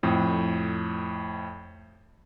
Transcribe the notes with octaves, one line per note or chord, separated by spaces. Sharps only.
F2 A2